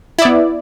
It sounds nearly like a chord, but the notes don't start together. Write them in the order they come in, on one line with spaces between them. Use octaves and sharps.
E4 D5 B3